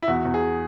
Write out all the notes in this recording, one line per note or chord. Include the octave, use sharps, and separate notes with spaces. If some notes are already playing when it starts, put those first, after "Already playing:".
E4
E2 F#4
E2
G#4